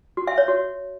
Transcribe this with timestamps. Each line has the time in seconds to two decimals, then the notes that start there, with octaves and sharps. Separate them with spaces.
0.17 F#4
0.27 E5
0.38 C#5
0.48 F#4